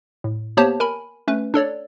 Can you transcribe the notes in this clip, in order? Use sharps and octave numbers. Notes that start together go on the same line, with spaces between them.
A2
A#3 B3 G4 C5 C#5 A5
A#4 G#5 B5
A3 C#4 B4
D4 A4 C#5 D5